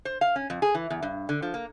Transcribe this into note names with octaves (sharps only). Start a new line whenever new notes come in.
C5
F5
C#4
F2
G#4
E3
E2
G2
D3
F3
A#3